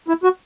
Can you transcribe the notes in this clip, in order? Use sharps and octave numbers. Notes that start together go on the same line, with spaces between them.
E4
F#4